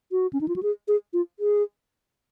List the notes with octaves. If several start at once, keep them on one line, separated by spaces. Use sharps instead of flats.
F#4
C#4
D#4
F4
F#4
G#4
G#4
F4
G#4